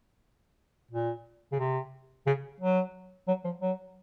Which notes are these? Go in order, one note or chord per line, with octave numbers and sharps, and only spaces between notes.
A#2
C#3
C3
C#3
F#3
F#3
F3
F#3